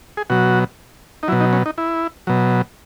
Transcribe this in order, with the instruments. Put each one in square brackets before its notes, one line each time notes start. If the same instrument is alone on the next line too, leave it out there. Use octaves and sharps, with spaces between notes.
[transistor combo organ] G#4
B2 F#3 F#4
D#4
F#3 E4
B2
D#4
C#4
D#4
E4
B2 F#3